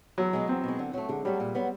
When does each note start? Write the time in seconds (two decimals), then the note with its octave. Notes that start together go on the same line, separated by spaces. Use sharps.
0.18 E2 F#3
0.33 B2 G#3
0.48 E2 C4
0.64 B2 G#3
0.79 D3
0.93 F#3 A3
1.09 D3 G#3
1.25 F#3 G3 A3
1.40 A#2
1.55 F#3 B3